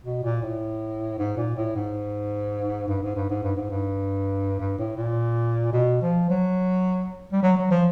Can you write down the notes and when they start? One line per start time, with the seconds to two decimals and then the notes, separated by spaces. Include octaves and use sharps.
0.04 B2
0.23 A#2
0.43 A2
1.18 G#2
1.37 A#2
1.56 A2
1.76 G#2
2.88 G2
3.03 G#2
3.16 G2
3.29 G#2
3.43 G2
3.56 G#2
3.70 G2
4.60 G2
4.78 A2
4.97 A#2
5.73 B2
6.02 F3
6.30 F#3
7.32 G3
7.43 F#3
7.58 F#3
7.71 F3